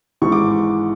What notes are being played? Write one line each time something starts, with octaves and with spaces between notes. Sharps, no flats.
G#1 G#2 E3 C#6
D6